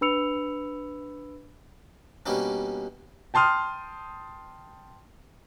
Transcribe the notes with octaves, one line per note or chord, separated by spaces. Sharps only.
D4 B4 B5 E6 C#7 F7
B2 G3 A#3 C#4 D4
G5 A5 C6 D#6 F6